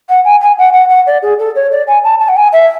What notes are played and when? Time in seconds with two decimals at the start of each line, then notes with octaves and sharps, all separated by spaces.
0.09 F#5
0.25 G#5
0.41 G#5
0.58 F#5
0.73 F#5
0.89 F#5
1.06 D5
1.22 G#4
1.39 A4
1.55 C#5
1.71 D5
1.87 G#5
2.04 A5
2.20 A5
2.28 F#5
2.36 G#5
2.52 E5